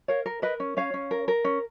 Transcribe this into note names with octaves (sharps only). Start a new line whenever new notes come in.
A#4 C#5 F5
A#4
A#4 B4 D#5
C#4
C#4 C#5 F5
C#4
A#4
A#4
C#4